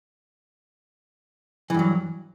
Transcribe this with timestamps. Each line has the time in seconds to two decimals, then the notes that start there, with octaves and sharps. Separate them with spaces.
1.70 E3
1.74 G2
1.79 F#3